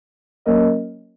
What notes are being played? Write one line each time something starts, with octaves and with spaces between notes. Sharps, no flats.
F#3 A#3 C#4 A#4 D#5